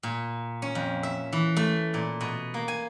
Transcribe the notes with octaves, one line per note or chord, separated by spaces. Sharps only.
A#2
C#4
F2
E5
E3
A3
A#2
B2
A#3
G#5